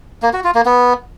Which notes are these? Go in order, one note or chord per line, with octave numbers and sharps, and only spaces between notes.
A#3
F#4
F4
A#3
B3